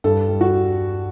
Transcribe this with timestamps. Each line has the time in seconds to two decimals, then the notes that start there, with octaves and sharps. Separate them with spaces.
0.04 G2 A4
0.29 G3
0.41 F#4